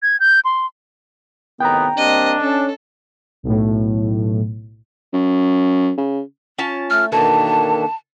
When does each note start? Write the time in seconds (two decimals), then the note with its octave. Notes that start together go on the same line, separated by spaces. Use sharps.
0.03 G#6
0.20 G6
0.45 C6
1.60 A2 C3 D#3 B3 G5 A#5
1.97 G3 A#3 C4 D4 D#5
2.41 C#4 A4
3.43 B1 A2
5.13 F#2
5.98 C#3
6.59 C#4 F4 A5
6.90 A3 F6
7.12 B2 D#3 E3 A3 A#3 D4 A5